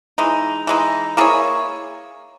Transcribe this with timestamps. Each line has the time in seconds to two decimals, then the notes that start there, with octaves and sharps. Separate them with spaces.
0.18 E3 G#3 D#4
0.67 E3 G#3 D#4
1.17 A#3 E4 G#4 C#5